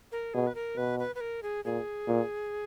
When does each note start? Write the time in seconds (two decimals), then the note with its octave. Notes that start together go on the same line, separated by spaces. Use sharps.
0.12 A#4
0.34 B2 G#4
0.47 B4
0.55 A#4
0.77 B2 B4
0.99 B4
1.15 B4
1.21 A#4
1.43 G#4
1.65 A#2 G#4
2.07 A#2